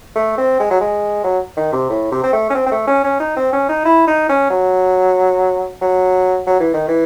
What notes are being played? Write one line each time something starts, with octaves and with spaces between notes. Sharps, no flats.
A3
C4
G#3
F#3
G#3
F#3
D#3
C3
A2
C3
C4
A3
C#4
C4
C4
A3
C#4
C#4
D#4
C4
C#4
D#4
E4
D#4
C#4
F#3
F#3
F#3
E3
D#3
E3